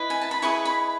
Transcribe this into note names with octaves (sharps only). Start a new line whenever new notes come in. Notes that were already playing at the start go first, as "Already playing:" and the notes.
Already playing: E4 B4 D#5
G#5
A5
B5
E4 G#4 B4 D#5 C#6
B5